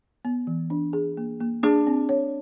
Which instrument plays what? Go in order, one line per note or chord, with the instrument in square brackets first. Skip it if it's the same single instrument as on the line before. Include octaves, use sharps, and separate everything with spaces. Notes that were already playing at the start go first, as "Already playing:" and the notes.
[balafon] B3
E3
D4
G#4
A#3
A#3
[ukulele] D4 [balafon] G#4
[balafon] C4
C#5